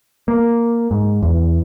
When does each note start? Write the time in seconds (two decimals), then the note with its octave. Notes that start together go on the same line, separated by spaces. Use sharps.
0.28 A#3
0.91 G#2
1.23 E2